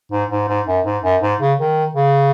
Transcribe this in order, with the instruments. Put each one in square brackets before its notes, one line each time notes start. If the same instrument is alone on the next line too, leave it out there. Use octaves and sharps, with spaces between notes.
[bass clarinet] G#2
G#2
G#2
F#2
G#2
F#2
G#2
C#3
D#3
C#3